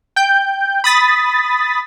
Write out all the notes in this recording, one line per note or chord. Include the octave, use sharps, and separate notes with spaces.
G5 G6
B5 D#6 A6 B6